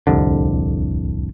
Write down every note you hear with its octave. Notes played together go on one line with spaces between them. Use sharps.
D1 C2 F2 D3